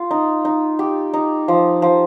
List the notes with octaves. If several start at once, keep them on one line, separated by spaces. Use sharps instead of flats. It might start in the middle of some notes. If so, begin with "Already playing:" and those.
Already playing: F4
D#4
D#4
G4
D#4
F3
F3